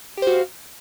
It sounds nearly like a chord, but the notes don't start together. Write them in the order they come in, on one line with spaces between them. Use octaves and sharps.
G4 C5 F#4 F5